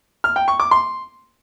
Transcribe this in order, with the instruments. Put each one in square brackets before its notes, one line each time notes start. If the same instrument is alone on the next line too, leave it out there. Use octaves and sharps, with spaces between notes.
[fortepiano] F6
G5
C#6
D6
C6